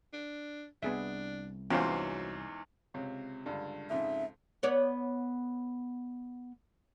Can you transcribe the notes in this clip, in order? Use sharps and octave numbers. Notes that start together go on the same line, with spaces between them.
D4
C2 B3 D4 G#4 E5
E2 G#2 F#3 B3 C#4 F4 C5
C#2 C3 C#5
C#2 G2 D3
F2 G#2 C#3 E5
B3 C#5 D5